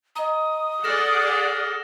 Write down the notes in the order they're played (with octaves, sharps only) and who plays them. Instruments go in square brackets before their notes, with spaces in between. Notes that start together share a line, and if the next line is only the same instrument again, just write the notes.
[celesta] D#5 A#5 [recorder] D#6
[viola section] G#4 D5 F#5 [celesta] A4 [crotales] F6 A#6 E7